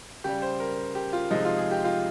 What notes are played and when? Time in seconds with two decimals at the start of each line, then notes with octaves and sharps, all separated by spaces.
0.24 C#3 G3 G4
0.42 C5
0.60 A#4
0.95 G4
1.13 F4
1.31 C3 F3 G#3 D#4
1.45 F4
1.57 G#4
1.71 G4
1.84 F4